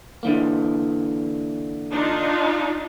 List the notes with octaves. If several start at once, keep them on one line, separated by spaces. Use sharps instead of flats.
D3 E3 A#3
D4 D#4 F4